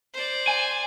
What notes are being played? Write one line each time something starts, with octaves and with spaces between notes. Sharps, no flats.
C5 D5
G#5